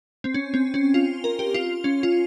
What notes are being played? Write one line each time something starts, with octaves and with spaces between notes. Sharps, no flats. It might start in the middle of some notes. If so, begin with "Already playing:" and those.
C4
C#4
C4
C#4
F4
A#4
G4
F4
C#4
F4